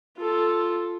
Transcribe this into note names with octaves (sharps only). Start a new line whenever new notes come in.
F4 A4